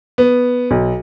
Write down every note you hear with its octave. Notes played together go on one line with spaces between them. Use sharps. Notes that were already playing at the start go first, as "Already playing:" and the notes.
B3
B1